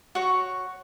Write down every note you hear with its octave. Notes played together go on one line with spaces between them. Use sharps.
F#4 C#5